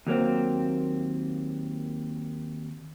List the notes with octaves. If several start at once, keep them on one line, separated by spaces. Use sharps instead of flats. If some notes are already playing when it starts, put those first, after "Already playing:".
D#2 F#3 A#3 C4